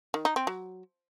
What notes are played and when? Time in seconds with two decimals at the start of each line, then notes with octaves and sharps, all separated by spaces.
0.14 D#3
0.25 D#4
0.36 C4
0.47 F#3